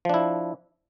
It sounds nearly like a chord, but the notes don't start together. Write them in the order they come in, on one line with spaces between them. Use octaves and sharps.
F3 D4 E4